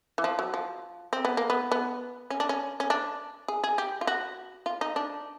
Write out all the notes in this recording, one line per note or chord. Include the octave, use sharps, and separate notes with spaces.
E3
F3
F#3
F3
C4
B3
A#3
B3
B3
C#4
D4
C#4
C#4
D4
G#4
G#4
G4
F4
F#4
F4
D#4
D4